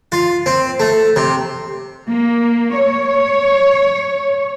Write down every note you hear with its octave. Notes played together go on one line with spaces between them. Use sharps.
F4
C4
A3
C3
A#3
C#5